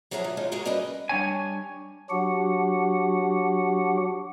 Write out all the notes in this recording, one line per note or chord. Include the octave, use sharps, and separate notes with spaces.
F3 F#3 B3 G#4 E5 A#5
D3
G#2 G#3 D#4 F4 C#5
G#2 G#3 F#4 G#4 A#4 A#5
G3 C#4 A#4 B4 D#5
G3 D4 C#5 G#5
F#3 D4 F#4 G4 F#5